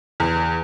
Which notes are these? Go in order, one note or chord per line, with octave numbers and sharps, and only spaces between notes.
E2